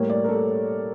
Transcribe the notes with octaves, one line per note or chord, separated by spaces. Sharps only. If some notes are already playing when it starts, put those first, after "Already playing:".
Already playing: A2 G3 A#3 C#5
D5
A#4
A4